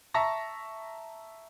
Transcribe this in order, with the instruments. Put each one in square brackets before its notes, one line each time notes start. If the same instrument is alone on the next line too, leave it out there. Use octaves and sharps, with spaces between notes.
[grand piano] E5 A5 A#5 C#6 A#6